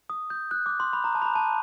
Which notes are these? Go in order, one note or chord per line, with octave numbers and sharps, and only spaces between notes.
D#6
G6
F#6
D6
C6
B5
A#5
A5
B5
A#5
A5